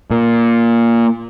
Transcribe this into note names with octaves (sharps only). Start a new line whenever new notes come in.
A#2